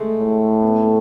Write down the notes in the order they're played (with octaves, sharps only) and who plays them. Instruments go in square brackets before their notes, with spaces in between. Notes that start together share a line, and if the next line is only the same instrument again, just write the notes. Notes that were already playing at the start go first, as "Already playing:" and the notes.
Already playing: [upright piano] G#3 A3
[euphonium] A2
[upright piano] B3
A3